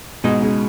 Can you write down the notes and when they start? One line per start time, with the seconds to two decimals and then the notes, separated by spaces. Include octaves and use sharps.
0.24 B2 G#3 D#4 G#4 D#5
0.42 C#3